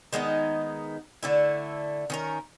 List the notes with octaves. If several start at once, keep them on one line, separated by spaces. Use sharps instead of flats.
D#3 G#3 B3 D#4
D3 A3 E4
D#3 C#4 A#4